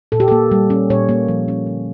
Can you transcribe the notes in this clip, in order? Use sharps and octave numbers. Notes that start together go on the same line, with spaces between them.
A#2 A4
G4
A#3 A4
G3
C#4
A#2 C#5
A#3
F3
C#4
D3